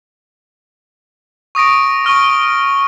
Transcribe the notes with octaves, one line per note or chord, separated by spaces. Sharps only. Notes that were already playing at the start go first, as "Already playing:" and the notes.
C#6 D#6 A#6 D7
C#6 F6 G7